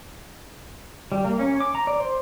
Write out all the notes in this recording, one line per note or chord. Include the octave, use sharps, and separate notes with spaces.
G3
A#3
C#4
D6
A#5
D5
C5